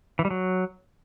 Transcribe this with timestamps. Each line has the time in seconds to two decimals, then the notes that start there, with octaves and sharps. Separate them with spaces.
0.19 E3
0.25 G3
0.31 F#3